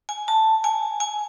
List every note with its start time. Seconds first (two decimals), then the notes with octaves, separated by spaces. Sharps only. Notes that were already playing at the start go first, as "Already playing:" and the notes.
0.09 G#5
0.28 A5
0.64 G#5
1.00 G#5